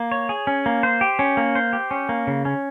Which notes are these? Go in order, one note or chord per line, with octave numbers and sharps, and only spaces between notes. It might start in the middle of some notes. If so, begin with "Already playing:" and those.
Already playing: A#3
C#5
G#4
C#4
A#3
C5
G4
C#4
A#3
C5
G4
C#4
A#3
C#3
C#4